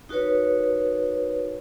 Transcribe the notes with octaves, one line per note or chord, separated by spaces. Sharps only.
D#4 F#4 A#4 B4 C#5